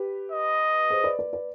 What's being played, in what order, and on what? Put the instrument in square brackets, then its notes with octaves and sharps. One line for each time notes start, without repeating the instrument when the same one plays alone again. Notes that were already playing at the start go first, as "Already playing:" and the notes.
Already playing: [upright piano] G4 B4
[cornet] D#5
[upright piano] G#4 C5
B4 D5
B4 D5
B4 D5